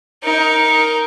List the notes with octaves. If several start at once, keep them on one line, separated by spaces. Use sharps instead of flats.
D#4 A#4